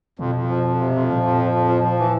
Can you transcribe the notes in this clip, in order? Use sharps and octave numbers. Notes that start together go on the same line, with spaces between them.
F2 B2
F2
F3
F2
C3
F2
A#2 F3
F2
F3
F2
F3
F3
E3